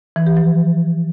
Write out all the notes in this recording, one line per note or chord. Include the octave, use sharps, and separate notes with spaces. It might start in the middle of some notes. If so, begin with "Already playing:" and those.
E3
G4
F3